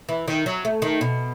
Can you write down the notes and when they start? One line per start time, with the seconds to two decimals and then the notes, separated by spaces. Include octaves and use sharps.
0.09 E3
0.28 D#3
0.46 F#3
0.65 A3
0.82 D#3
1.01 B2